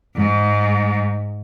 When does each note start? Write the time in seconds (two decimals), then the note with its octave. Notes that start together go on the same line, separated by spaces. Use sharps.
0.16 G#2